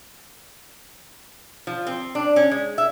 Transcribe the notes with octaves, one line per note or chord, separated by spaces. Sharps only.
F3
C4
D4
C#4
G#3
E5